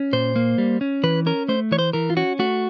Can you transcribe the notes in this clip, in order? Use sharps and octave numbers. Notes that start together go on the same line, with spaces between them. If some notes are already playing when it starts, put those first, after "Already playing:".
Already playing: C#4
A#2 C5
A#3
G3
C#4
E3 B4
C#4 A#4
A3 C5
E3 C#5
C5
E3 A#4
F4
C#4 F#4
A3 F#4